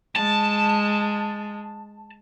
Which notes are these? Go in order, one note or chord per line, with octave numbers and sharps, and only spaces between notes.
G#3 A5